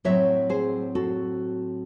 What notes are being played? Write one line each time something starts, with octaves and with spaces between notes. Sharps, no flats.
A2 F#3 C4 C#5 E5
G#4 C5
F#4 A4